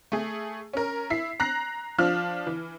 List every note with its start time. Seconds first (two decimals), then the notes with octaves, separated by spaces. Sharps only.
0.12 A3 G#4
0.73 C#4 A#4
1.10 E4 B6 C7
1.40 A#5 F#6 A#6 C7
1.98 F3 D4 F4 F6
2.47 E3